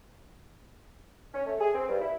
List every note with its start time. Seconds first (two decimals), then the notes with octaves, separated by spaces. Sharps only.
1.34 C#4
1.46 A3
1.60 G#4
1.74 C4
1.89 G2
2.01 E4